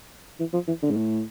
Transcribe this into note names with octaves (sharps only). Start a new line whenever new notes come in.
E3
F3
E3
D3
G#2
A2